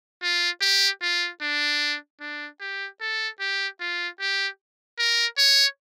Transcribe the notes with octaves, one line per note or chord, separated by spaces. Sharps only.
F4
G4
F4
D4
D4
G4
A4
G4
F4
G4
A#4
C#5